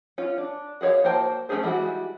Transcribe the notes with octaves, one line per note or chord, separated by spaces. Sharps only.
C#4 F4
D4
F#4 G#4 C5 C#5 F5
A#3 F#4 C5 G5 A5
A3 C#4 D#4 G#4 C5
E3 G3 G#3 E4 F#4